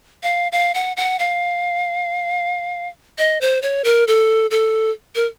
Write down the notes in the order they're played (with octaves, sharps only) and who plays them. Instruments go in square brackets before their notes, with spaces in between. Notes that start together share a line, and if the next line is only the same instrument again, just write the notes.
[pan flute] F5
F5
F#5
F#5
F5
D#5
C5
C#5
A#4
A4
A4
A#4